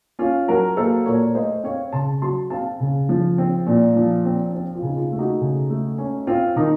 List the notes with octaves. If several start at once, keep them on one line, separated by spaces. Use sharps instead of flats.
C#4 F4
F#3 F#4 A#4
A#3 A4 C5
A#2 A#4 C#5
A3 C5 D#5
C4 C#5 F5
C#3 A5 C6
F#3 A5 C6
C4 F5 A5
C#3
F3
C4
A#2
F3
C4
C4
F4
C#3 D#4
F4
A3
D#4 F#4
C#3
A3
C#4
C4 F4
D#3 D#4